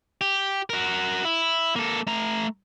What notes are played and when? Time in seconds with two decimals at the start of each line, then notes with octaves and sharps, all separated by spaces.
0.21 G4
0.70 F#4 A#4
1.25 E4
1.76 A#3 A4
2.07 A3 A#5